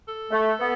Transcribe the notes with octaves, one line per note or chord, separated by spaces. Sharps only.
A4
A3
B3